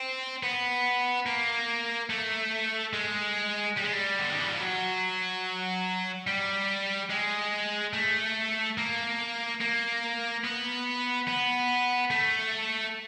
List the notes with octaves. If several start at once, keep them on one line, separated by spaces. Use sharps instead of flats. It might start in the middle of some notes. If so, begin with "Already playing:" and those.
Already playing: C4
B3
A#3
A3
G#3
G3
G#3
G3
D3
D#3
E3
F3
F#3
G3
G#3
A3
A#3
A#3
B3
B3
A3